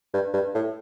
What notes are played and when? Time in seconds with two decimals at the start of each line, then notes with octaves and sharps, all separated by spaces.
0.14 G2
0.34 G2
0.55 A2